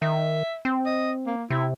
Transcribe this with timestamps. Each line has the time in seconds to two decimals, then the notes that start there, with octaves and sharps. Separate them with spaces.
0.02 D#3 E5
0.65 C4
0.86 D#5
1.26 A#3
1.50 C3 E4